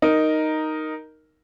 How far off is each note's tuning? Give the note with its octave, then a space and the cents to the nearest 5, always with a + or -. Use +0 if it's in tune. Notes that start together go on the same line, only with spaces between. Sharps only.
D#4 +0 A#4 +0